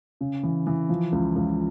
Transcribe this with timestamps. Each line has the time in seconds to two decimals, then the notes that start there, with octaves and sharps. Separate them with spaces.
0.21 C#3
0.43 E3
0.67 E3
0.89 F3
1.12 C#2
1.36 C#2